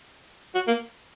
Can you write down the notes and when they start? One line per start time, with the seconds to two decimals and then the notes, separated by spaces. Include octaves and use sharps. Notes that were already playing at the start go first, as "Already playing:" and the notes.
0.55 F#4
0.67 A#3